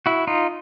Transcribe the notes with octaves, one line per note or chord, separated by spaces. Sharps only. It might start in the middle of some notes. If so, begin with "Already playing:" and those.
E4 F#4
D#4 F4